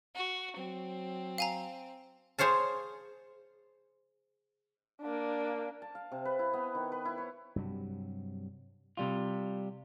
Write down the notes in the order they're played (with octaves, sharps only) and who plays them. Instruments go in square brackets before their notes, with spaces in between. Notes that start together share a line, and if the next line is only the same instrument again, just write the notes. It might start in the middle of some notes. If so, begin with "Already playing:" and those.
[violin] F#4
[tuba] F#3 [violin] C4
[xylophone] F5 G#5 A#5
[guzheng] G#4 C5 C#5 F5 A5
[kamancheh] A#3 D4
[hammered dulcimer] A5
F5
C3
B4
E4
B3
D#3
B4
E4
C#5
[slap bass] G2 C3 F#3
[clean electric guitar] C3 G3 F4